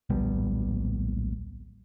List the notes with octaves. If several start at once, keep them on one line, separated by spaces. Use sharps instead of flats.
D1 A#1 G3 B3